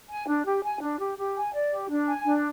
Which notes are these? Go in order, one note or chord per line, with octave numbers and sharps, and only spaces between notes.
G#5
D4
G4
G#5
D4
G4
G4
G#5
D5
G4
D4
G#5
D4